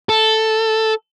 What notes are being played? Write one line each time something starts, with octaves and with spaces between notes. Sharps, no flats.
A4